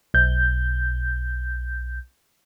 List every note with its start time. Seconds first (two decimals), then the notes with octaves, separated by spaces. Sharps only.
0.14 B1 G6